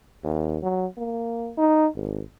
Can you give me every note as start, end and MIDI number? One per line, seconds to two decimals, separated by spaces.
0.24 0.58 39
0.63 0.86 54
0.98 1.52 58
1.58 1.87 63
1.96 2.21 32